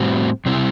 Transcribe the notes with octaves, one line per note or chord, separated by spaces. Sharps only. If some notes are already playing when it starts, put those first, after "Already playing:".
Already playing: A2 G3 C4 F#4
C3 G3 C4 E4